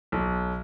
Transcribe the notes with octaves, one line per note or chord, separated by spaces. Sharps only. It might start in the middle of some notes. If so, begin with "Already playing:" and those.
B1